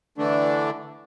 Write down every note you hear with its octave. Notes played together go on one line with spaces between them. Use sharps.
D3 E3 A3 D4